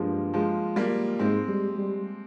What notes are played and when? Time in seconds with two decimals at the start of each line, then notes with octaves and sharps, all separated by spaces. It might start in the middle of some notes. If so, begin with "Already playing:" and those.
Already playing: G2 F3 G3 G#3 A#3
0.34 F3 G#3
0.76 G3 A#3
1.19 G#2 G#3 C4
1.48 G3
1.77 G3